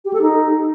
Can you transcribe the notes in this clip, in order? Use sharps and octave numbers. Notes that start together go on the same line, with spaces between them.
G4
A4
D#4